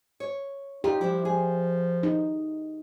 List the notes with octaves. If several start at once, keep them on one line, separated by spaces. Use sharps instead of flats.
C#5
D#4 F4 G4
F3 G3 D4 E4
G#4
D#4